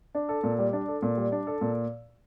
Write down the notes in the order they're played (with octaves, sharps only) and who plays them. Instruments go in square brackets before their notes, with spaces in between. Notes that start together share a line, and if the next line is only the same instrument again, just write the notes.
[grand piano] D4
A4
A#2
G3
D4
A4
A#2
G3
D4
A4
A#2